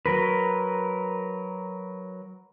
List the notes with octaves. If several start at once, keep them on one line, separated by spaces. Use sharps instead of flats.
F#3 A#4 B4